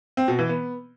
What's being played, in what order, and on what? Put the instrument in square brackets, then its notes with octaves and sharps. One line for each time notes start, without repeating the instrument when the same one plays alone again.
[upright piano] C4
B2
E3
B3